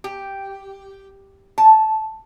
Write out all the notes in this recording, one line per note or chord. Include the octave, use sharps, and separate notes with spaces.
G4
A5